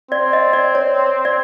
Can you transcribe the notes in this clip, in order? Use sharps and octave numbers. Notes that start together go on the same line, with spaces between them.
C4 D5
D#5
D5
C#5
D5